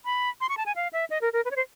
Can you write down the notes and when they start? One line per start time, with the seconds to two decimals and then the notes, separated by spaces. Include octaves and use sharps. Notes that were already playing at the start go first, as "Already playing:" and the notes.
0.05 B5
0.41 C6
0.49 C#6
0.57 A5
0.66 G#5
0.76 F5
0.93 E5
1.10 D#5
1.21 A#4
1.33 A#4
1.45 B4
1.51 C#5
1.56 C5